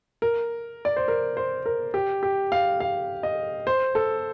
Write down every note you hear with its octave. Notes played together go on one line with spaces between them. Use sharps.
A#4
D5
C5
A#4
C5
A#4
G4
G4
F5
F5
D#5
C5
A4